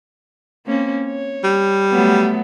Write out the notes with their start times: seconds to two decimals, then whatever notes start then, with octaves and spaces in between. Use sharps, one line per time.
0.67 A#3 C4 C#4
1.06 C#5
1.44 G3
1.91 F#3 A3 B3